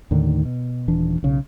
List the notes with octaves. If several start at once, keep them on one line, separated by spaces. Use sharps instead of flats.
D#2 A2 D3 D#3
B2
D#1 E3 D4
B1 C#3